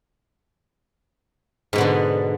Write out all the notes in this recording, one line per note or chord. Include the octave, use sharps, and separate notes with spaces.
G#2 B2 D3 B3